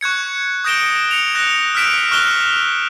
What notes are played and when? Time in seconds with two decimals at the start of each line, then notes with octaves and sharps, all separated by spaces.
0.01 C#6 F#6 G#6 C#7
0.64 D#6 G6 A#6 D7 E7 G7
1.11 C#7 F7
1.35 F#6 A#6
1.75 E6 F6 G6 B6 D7 E7
2.11 C#6 F6 F#6 E7 F7 G7